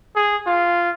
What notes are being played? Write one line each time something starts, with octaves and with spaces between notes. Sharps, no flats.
G#4
F4